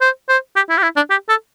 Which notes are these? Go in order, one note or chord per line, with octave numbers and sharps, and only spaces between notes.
C5
C5
G4
E4
G4
E4
D4
G4
A4